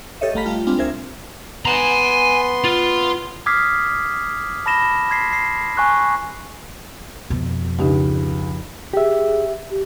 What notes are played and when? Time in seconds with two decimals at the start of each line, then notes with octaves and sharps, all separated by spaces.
0.21 G4 A4 C#5 D#5 E5
0.34 G1 A3 F5 A#5 B5 B6
0.46 G3 A3 F4
0.67 G3 G#3 C4 D4 F4
0.78 C2 A#4 C5 E5 G#6
1.65 B3 G#5 A#5 C6
2.64 F4
3.46 D6 D#6 F6 G#6 B6 C7
4.66 A5 B5 A#6 E7 G7
5.10 C6 G#6 B6 C7
5.33 C7
5.77 G#5 C#6 F#6
7.30 F2 B2
7.79 C#2 D4 D#4 G4
8.94 G4 G#4 E5
9.71 G4